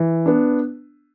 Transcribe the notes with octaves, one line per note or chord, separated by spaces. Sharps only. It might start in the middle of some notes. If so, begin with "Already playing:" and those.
Already playing: E3
B3 D4